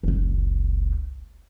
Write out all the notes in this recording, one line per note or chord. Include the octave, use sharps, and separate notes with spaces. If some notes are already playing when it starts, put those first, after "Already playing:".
F#1 C#2